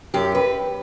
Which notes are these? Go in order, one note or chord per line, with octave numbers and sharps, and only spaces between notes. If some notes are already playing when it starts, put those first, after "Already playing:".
F#2 G4
B4